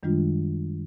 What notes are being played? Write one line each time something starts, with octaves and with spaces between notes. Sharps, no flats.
F#2 D#3 G3 G#3 D4 F4